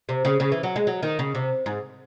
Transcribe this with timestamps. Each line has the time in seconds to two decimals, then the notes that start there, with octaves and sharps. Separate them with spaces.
0.09 C3
0.25 C#3
0.40 C#3
0.52 E3
0.63 F#3
0.76 G#3
0.87 F#3
1.03 D#3
1.19 C#3
1.35 C3
1.66 G#2